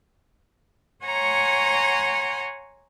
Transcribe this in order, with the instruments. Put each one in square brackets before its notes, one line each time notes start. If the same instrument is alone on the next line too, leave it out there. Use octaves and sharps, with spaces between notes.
[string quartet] C#5 F#5 G#5 A#5 C6